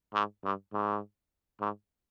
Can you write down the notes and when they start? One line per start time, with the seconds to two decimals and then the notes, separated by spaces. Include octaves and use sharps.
0.13 G#2
0.44 G2
0.73 G#2
1.60 G#2